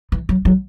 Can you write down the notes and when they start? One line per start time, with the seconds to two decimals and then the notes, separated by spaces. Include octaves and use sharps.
0.12 E3
0.29 F#3
0.45 F#3